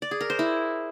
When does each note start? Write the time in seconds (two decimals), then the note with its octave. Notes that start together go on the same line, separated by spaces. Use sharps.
0.02 D5
0.11 G#4
0.21 A#4
0.30 C5
0.39 E4